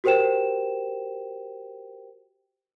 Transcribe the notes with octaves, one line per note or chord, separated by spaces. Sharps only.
F#4 G4 A#4 C5 G5 E7